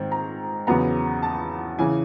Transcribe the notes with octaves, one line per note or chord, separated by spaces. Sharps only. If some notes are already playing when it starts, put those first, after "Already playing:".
Already playing: G#2 D#3 C4
A#5
E2 C#3 F#3 B3 A#5
A5
C#3 E3 G#5